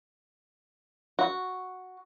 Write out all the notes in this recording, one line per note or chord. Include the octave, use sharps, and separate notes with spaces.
F#4